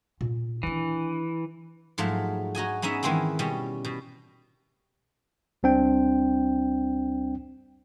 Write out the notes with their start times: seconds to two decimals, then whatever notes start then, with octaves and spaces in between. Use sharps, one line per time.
0.21 A#2
0.63 D#3 E3 D4
1.98 G#2 F3 F#3 A3
2.55 D#4 F#4 D#5 G#5
2.82 G#3 B3 C#4 D#4 E5
3.03 D#3 E3 G#3 C4 E4
3.39 B2 G3 C#4
3.85 B2
5.63 C#2 G3 C4 D4 G5